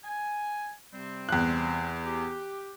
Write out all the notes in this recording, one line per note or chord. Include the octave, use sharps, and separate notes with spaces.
G#5
C3 G3 C4
E2 F#6
G4